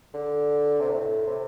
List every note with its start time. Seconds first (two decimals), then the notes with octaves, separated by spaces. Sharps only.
0.14 D3
0.80 C3
0.89 A2
1.27 C3